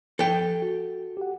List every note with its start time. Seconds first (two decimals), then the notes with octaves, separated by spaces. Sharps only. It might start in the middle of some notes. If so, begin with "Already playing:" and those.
0.19 F3 A4 G5
0.62 F#4
1.17 G4 F#5